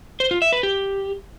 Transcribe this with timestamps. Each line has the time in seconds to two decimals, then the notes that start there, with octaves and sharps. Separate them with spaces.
0.20 C5
0.31 F4
0.42 E5
0.52 B4
0.63 G4